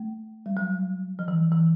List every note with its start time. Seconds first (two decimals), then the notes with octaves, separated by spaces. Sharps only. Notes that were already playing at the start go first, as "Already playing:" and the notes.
Already playing: A3
0.46 G3
0.57 F#3
1.19 F3
1.28 E3
1.52 E3